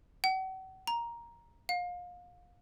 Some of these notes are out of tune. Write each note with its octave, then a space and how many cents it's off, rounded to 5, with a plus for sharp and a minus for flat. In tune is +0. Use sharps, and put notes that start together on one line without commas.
F#5 +40
A#5 +10
F5 +30